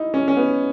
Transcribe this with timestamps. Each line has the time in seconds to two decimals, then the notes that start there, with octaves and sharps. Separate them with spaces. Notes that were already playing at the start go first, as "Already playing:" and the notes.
Already playing: D#4 E4
0.14 C#4
0.28 C#4
0.37 B3